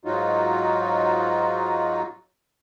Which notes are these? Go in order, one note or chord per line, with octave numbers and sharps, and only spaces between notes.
G#2 F#3 D#4 F4 F#4